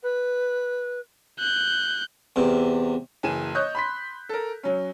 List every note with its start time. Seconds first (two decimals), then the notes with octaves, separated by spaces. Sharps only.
0.03 B4
1.39 F#6 G6
2.36 E2 C3
3.23 F#1 E3 G#4 D#7 E7
3.54 C#5 D#5 F#6 G6
3.75 B5 C6 B6
4.29 A4 A#4
4.63 F#3 C#4